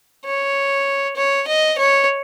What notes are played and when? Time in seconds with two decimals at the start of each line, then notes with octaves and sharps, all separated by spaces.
0.25 C#5
1.16 C#5
1.47 D#5
1.78 C#5